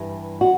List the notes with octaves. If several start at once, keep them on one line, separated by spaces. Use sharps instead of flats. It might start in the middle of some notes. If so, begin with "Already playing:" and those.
Already playing: G2 E3
F#4